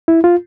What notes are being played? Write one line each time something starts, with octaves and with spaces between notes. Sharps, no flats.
E4
F4